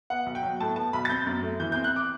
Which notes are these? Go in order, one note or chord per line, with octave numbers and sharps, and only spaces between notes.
B3 F#5
B1
G5
F#3
A2 A5
B3 A5
B1 B5
A6
C4 G6
F#2
A3
E3 G6
C4 G6
F#6
D6